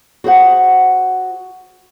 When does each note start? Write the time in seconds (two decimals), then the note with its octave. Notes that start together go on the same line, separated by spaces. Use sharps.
0.24 F#4 G#4 C5 F#5